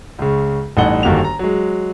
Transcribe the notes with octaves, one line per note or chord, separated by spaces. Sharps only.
C#2 C#3
A1 G2 D#4 A4 F#5 G7
G1 D#3 A#3 F#4 G4 F7
A#5
F#3 G#3